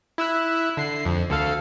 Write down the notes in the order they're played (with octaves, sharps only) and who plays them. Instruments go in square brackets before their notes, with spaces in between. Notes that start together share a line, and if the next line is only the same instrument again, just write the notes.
[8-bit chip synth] E4 E6 F#6
D3 C7
F2
D2 A4 F5